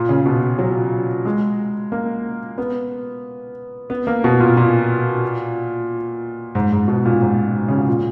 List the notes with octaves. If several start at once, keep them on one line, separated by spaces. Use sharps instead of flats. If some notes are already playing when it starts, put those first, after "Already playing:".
Already playing: A#2
C#3
B2
F#3
G#3
A#3
B3
B3
A#3
B2
A#2
A#2
G#2
G#2
B2
A#2
G#2
C#3
B2
A#2